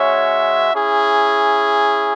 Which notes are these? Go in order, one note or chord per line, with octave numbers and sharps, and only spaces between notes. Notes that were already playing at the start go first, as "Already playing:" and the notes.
Already playing: G#3 C#4 F#4 C#5 E5
C#4 E4 G#4